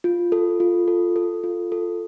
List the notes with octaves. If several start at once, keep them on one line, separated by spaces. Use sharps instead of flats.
F4
A4
F4
A4
A4
F4
A4